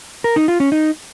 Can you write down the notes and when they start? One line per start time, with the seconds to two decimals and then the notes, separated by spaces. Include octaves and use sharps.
0.24 A#4
0.36 D#4
0.48 F4
0.60 C#4
0.72 D#4